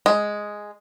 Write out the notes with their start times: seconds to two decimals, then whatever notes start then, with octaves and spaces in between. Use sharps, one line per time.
0.06 G#3